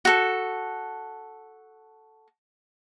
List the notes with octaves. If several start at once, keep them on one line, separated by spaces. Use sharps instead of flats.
F#4 A4